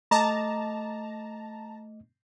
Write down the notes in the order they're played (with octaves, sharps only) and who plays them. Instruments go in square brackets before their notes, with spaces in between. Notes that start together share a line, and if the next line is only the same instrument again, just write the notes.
[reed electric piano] A3 D#5 D6 [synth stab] A5 A#5